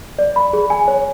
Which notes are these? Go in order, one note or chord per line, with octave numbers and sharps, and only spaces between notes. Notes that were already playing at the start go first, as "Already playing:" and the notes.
D5
B5
G#4
G#5
C#5